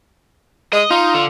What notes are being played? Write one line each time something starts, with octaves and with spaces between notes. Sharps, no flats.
G#3 D#5
D#4 F4
D3